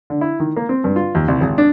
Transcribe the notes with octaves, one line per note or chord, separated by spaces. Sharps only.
D3
E4
D#3
A#3
C4
G2
F4
D#2
C2
G#1
D4